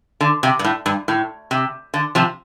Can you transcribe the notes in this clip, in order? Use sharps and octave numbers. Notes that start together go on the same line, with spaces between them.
D3
C3
G2
A2
G2
A2
C3
D3
C3 F3